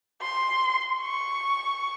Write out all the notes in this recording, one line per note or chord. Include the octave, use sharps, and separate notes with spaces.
C6
C#6